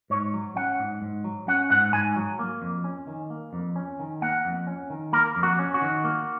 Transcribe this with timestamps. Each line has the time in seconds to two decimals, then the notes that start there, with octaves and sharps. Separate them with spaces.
0.10 G#2 C#5
0.34 F#3
0.56 C#4 F#5
0.80 G#2
1.02 G#2
1.24 F#3
1.48 C#4 F#5
1.70 G#2 F#5
1.93 G#2 G#5
2.16 F#3
2.39 A#3
2.62 F2
2.84 C#4
3.07 D#3
3.30 A#3
3.53 F2
3.76 C#4
3.99 D#3
4.22 A#3 F#5
4.45 F2
4.67 C#4
4.90 D#3
5.13 A#3 A#4
5.36 F2
5.43 F#4
5.59 C#4
5.74 F#4
5.82 D#3
6.04 A#3